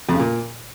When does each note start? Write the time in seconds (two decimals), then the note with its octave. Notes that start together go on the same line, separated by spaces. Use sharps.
0.09 F2
0.14 C#3
0.20 A#2